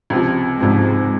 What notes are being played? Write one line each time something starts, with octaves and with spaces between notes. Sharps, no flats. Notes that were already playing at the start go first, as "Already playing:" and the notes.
C#2 C3 F3
C#2 G#2 C3 F3